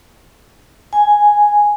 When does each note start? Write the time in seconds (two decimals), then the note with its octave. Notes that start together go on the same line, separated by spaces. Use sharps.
0.93 G#5